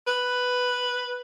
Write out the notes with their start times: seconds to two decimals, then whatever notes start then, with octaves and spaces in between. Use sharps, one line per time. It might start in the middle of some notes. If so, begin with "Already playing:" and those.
0.07 B4